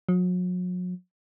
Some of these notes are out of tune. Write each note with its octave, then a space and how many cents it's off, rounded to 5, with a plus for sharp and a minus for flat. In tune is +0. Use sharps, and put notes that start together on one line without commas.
F#3 -40